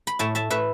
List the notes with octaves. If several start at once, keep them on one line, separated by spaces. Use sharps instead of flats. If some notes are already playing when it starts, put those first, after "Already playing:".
B5
A2 E5 A5
E5 A5
A2 B4 E5